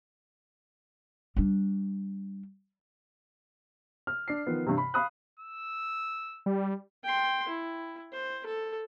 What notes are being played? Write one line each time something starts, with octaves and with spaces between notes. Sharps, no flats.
G3 D4
F6
D4 C7
D#3 F3 B3
G2 C3
B5
F5 B5 D#6 F#6
E6
G3
G5 C6
E4
C5
A4